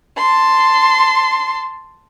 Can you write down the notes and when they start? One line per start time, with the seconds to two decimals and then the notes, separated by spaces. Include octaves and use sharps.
0.17 A5 C6